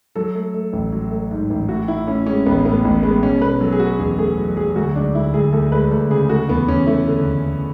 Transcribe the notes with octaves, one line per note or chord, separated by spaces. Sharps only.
F#3 A4
A3
A3
A1
F#3
A3
G#2
A1
A2 F#4
A2 E4
A2 C#4
G#3 C#4
A1 B3
A2 B3
A1
G#3 B3
B2 C#4
B2 B4
F#3 A4
G#4
A3 F#4
E2 G#4
A3 G#4
F#3
F#3 G#4
D2 F#4
G#3 D4
D2 E4
D2 G#4
D2 A4
G#3 B4
D2 A4
C#3 G#4
A3 F#4
E2 B3
E2 C#4
A3 E4
D3
E2
E2